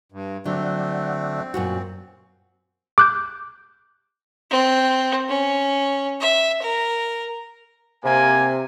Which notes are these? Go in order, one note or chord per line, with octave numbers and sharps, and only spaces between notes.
G2
D3 F#3 A3 C4 D5 F#5
F#2 A#2 F#4
D6 F#6 G6
C4
C#4
E5
A#4
C3 A#3 G#5